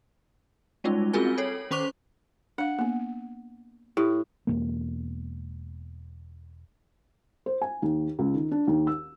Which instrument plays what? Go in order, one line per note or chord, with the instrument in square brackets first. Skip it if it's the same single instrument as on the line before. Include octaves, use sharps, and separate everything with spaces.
[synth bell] G3 G#3 C#4 D#4 F4
C4 F4 F#4 G#4 A#4 G#5
A4 C#5
D#3 C#4 C5 C#6 D6 F7
[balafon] D4 F5 [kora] F#5
[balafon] A#3 B3
[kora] A2 [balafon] G4
[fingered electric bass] E1 D#2 A#3
[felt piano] C5
G#5
D#2
C#2
D#3
D4
D#2
E6